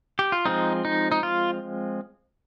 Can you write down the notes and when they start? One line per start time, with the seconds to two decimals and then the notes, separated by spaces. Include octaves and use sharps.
0.19 G4
0.32 F4
0.46 F3 G#3 C4 D#4
0.85 D#4
1.12 D#4
1.23 F4